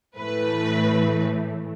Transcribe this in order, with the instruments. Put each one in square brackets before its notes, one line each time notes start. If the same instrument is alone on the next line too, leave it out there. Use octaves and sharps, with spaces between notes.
[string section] A2 E3 A3 B4